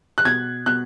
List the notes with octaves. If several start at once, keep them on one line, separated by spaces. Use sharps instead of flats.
F#6
B2 G#6
B2 F#6